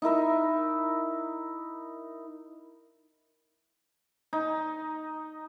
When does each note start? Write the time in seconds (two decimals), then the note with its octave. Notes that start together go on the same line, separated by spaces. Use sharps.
0.02 D#4 E4 A#4 E5
4.33 D#4